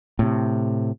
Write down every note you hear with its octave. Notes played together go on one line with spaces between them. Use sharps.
A2 C3